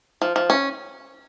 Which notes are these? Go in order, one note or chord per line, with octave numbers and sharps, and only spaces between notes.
F3
F3
C#4